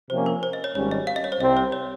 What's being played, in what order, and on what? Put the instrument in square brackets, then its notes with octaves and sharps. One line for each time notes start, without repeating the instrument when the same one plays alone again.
[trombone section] C3 F3 A#3 C#4 G4 [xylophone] C5
[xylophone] A#4
C5
D#5
C#5
[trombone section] G#1 G#2 G3 C#4 [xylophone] C#5
[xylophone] D#5
F5
D#5
C#5
C5
[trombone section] C2 C3 G3 C4 [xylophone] D#5
[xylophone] C5
C#5